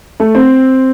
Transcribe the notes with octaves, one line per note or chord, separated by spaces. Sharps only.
A3
C4